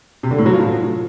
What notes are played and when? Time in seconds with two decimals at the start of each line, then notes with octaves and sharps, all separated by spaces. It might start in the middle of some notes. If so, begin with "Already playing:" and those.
0.23 C3
0.31 D3
0.38 A2
0.46 F#3
0.53 F3